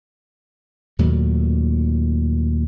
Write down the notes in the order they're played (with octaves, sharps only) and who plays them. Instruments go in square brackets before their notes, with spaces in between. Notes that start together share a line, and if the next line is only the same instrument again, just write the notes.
[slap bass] D#2 A#2 F#3 A3